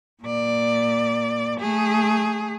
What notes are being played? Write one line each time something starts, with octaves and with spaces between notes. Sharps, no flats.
A#2 D5
A3 G#4